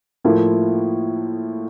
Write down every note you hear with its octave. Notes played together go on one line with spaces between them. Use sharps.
A2 F3 A#3 E4